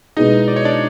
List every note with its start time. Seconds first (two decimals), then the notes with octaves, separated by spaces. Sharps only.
0.17 B2 G#3 B3 D#4 E4 G#4 D#5
0.48 D5
0.56 C#5
0.65 D4 D5